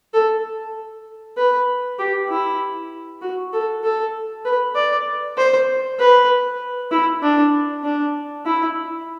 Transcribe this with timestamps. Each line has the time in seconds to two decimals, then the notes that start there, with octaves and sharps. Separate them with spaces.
0.14 A4
1.37 B4
1.99 G4
2.29 E4
3.22 F#4
3.53 A4
3.83 A4
4.45 B4
4.75 D5
5.37 C5
5.99 B4
6.91 E4
7.22 D4
7.84 D4
8.45 E4